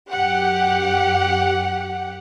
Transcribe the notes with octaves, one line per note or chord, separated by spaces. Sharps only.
F#2 G4 F#5